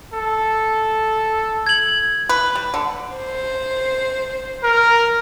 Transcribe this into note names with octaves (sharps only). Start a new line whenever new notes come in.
A4
G#6 F#7
B4
G3
D3
C5
A#4